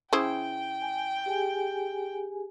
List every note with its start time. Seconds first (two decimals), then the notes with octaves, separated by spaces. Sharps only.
0.13 C#3 E4 C5 G5
0.82 G#5
1.26 G4 G#4 G#5